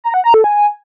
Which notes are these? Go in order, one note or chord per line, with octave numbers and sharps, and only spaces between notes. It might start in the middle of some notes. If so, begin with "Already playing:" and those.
A#5
F#5
A#5
A4
G#5